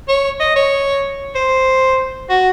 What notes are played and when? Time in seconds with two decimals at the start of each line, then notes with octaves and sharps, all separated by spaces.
0.08 C#5
0.40 D#5
0.56 C#5
1.35 C5
2.30 F#4